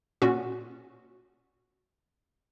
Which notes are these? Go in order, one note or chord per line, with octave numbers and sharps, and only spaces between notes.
A#2 C#4 F#4